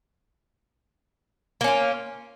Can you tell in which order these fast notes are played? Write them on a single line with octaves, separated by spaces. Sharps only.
A#3 C#4 F4